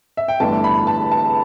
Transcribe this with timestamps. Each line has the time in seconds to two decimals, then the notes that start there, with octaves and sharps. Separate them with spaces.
0.17 E5
0.28 G5
0.40 G1 G2 E3 A3 D4 A5
0.64 B5
0.87 A5
1.12 A5